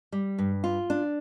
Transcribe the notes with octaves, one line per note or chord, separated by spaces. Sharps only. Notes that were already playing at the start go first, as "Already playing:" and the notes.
G3
G2
F4
D4